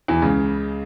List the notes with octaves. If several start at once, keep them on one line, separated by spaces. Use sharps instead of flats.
E2 E3
C#2 C#3